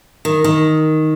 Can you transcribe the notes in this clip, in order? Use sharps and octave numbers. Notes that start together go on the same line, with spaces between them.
D#3
D#3